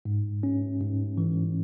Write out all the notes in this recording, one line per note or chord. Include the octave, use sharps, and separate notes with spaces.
G#2
C#4
G#2
E3